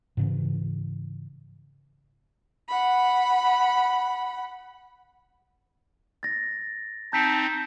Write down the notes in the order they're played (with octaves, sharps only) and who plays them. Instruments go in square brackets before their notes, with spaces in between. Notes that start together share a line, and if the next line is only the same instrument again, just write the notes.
[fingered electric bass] G#2 C#3 E3
[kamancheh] F#5 B5
[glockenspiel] A6 A#6
[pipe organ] C4 D#4 [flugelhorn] A5 [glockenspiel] G6 B6 D7